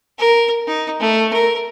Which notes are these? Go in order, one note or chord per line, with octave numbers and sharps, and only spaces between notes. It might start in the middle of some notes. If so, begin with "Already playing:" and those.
A#4
D#4
A3
A#4